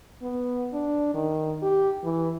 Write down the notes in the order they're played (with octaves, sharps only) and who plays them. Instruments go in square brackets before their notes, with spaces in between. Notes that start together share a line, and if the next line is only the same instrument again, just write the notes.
[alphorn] B3
D4
D#3
G4
E3